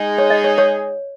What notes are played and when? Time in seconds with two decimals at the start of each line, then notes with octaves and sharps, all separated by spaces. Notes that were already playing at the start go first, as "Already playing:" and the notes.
Already playing: G#3 D#4 G#4
0.18 C#5
0.30 D#5
0.44 C#5
0.58 C#5